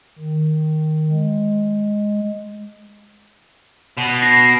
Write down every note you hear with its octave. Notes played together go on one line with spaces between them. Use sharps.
D#3
G#3
B2
A#6 C7